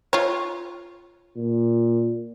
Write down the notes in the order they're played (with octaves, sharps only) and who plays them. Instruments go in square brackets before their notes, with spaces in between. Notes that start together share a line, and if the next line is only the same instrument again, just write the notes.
[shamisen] F4 C#5
[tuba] A#2